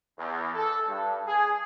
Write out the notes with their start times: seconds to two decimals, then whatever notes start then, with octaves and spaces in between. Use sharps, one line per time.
0.19 E2
0.55 A4
0.88 G2
1.27 G#4